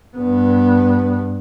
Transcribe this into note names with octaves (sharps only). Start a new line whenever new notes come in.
G2 B3